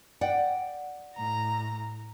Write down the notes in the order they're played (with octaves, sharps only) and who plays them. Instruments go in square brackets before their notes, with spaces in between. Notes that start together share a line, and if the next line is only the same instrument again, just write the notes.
[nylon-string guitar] D5 F#5 G5
[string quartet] A2 A#5